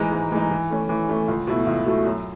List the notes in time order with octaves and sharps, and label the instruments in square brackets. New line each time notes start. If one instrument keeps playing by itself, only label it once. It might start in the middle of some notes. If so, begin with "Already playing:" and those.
Already playing: [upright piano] G#2 E3 G#3 D#4
G#2
E3 G#3 D#4
E3
A3 C#4
E3
A3 C#4
C#2
B2 F#3 A3 E4
C#2
B2 F#3 A3 E4
F#2